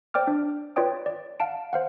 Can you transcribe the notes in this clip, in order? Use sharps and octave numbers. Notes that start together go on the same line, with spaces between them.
C5 D5 G5 D6 F6
D4
F4 B4 C#5 D5 G5 D#6
D5
F5 F#5 A5 D7
C5 F5 F#5